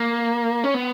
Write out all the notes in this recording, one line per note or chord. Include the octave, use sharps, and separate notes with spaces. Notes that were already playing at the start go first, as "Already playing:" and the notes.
Already playing: A#3
C#4
B3